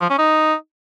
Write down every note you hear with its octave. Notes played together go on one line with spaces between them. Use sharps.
F3
C#4
D#4